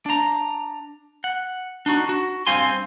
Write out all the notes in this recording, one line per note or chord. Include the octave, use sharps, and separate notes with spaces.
D4 A#5
F#5
D4 D#4 F#4
F#4
G2 C4 F5 G#5 C6